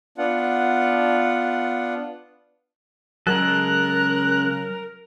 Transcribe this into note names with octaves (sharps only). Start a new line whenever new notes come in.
B3 D4 F4 F#5
C#3 F#3 G#3 A4 A#4 F#6